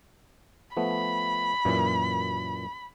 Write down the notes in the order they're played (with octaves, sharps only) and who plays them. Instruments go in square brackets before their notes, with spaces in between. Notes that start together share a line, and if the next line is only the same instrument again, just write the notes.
[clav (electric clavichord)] F3 A3 B3 [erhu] B5
[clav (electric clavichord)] F#2 A#2 E3